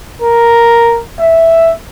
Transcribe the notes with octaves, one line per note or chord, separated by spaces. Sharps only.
A#4
E5